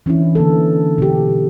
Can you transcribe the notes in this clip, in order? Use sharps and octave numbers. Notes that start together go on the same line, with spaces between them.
E3 C#4 D4 E4
D3 A#3 B3 A4
B2 D3 G4